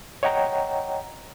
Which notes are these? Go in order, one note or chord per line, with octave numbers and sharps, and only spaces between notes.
C#5 D#5 F#5 G5 A#5